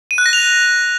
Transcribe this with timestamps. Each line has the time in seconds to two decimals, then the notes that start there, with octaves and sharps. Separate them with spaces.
0.11 D#7
0.18 F#6
0.26 A#6
0.33 F7